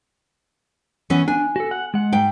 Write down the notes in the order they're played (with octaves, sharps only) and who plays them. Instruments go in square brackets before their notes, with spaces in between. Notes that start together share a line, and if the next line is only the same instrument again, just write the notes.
[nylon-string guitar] E3 B3 C#4
[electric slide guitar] D4 [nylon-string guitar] G#5
[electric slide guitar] F#4 A4
F#5
G#3 F#5
[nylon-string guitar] G#2 G5